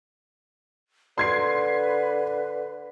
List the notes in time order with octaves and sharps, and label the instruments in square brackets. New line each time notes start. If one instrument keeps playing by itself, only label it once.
[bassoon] D3 [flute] B4 [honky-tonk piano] C6 G#6 C7